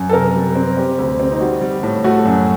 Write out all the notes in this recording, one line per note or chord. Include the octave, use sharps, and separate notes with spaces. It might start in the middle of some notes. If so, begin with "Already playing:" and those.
Already playing: F#2
A4
C3 A#4
G3
C4
C4 G4
D2
C4
D#4
G3 F#4
G3
A2
A3 F#4
F#2